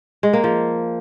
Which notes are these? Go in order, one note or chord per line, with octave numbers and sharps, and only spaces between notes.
G#3
A#3
F3